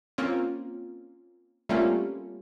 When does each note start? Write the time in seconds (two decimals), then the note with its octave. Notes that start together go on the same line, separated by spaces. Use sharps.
0.18 A#3 C4 C#4 F4
1.69 G3 A3 A#3 C4 C#4 F4